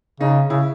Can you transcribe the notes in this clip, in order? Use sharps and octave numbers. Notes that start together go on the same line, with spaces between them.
C#3 D#4
C#3 E4